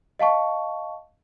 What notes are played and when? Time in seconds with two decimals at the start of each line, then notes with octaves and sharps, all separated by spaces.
0.19 D#5 F5 A5 C#6